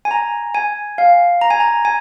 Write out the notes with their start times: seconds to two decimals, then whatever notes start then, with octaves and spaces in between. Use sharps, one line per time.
0.05 G#5
0.11 A#5
0.55 G#5
0.98 F5
1.41 A#5
1.50 G#5
1.60 A#5
1.85 G#5